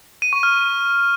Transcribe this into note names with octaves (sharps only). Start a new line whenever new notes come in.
D#7
C#6
F6